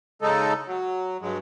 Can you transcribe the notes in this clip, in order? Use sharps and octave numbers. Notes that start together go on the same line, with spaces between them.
C#3 G#3 D#4 A4
F#3
G2 F#3 G#3